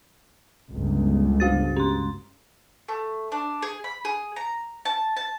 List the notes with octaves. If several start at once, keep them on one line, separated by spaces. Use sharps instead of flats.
G1 C#2
G#3 F#4 A6
C#4 C6
A3
D4
G#4
B5
G#4
A#5
A5
A5